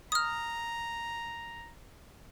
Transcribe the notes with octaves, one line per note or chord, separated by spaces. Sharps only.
A#5 D#6 F6